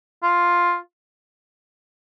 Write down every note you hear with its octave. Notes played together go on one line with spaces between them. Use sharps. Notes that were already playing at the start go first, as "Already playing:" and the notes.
F4